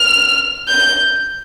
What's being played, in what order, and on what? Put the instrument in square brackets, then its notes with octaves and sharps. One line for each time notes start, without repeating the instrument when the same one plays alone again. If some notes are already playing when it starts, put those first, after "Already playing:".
Already playing: [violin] F6
G6